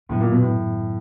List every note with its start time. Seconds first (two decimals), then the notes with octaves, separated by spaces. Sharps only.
0.09 F#2 A2 D#3 F#3 B3
0.20 A#2
0.31 B2
0.41 A2